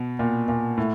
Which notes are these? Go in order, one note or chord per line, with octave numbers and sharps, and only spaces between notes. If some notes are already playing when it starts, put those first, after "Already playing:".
Already playing: B2
A#2
A#2
A2